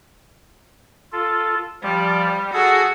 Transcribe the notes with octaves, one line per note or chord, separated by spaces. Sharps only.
F4 A4
F3 G3 D5
F#4 G#4 A4